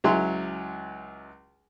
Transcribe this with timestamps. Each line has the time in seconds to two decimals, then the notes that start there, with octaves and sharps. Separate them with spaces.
0.04 C#2 F#3 E4 C6